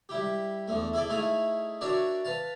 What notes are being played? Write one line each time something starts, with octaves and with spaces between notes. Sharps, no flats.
G3 E4 G4
E2 D3 A3
E4 G#4 A4 D5
A3 D#4 E4 G#4 F5
D4 F#4 A#4 C#5 D5 E5
B4 F5 A5